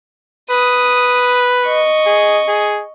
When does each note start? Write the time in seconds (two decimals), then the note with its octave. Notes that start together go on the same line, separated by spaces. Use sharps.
0.50 B4 D#6
1.66 D#5 C#6
2.06 G#4
2.48 G#4